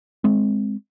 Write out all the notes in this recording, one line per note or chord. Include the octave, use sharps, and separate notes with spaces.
G#3 C4